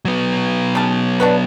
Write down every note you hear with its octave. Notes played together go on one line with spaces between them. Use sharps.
F#3 B3
C#3 A5
D4 F#4 B4